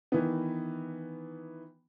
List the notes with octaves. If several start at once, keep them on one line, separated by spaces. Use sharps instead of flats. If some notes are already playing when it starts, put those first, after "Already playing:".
D#3 E3 B3